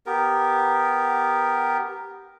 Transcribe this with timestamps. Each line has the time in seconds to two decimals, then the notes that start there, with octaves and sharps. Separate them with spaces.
0.06 B3 G4 A#4